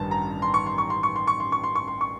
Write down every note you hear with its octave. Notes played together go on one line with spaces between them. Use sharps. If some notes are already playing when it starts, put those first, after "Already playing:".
Already playing: A1 G2 D#3 A5
A#5
C6
C#6
C6
C#6
C6
C#6
C6
C#6
C6
C#6
C6
C#6
C6
C#6